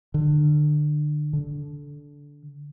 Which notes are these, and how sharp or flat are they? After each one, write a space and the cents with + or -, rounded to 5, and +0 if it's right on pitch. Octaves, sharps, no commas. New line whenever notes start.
D3 +30
D3 -15